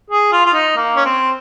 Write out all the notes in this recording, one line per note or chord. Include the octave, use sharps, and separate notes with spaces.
G#4
F4
F4
D#4
A#3
C#4
C4